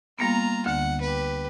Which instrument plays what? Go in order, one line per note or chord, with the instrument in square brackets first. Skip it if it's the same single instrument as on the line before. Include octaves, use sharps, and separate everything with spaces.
[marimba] G3 A#3 B3 [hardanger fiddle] F4 A#5
[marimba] D2 D3 [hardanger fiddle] F#5
[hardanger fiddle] G4 B4